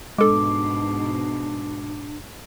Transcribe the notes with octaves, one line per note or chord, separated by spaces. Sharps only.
G#2 B2 G#3 D4 A4 D6